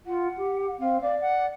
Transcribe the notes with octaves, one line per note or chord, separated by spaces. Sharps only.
F4 F#5
G4
C4 F5
D5 F5
F#5